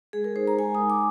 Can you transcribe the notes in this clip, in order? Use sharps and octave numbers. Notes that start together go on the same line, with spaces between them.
G#3 G#4
A#4
D#4 C5
A#5
G#3 G#5
D#6
D#4
D6